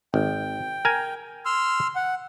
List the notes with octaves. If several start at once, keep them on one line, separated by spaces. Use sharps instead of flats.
G#1 G5
A#4 G#5
C6 E6 F6
F#5